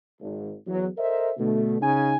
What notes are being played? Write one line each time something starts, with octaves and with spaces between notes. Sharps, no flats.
G#1
E2 F#3
A4 A#4 C5 D#5 E5
B2 D3 A3
C#3 D#4 G#5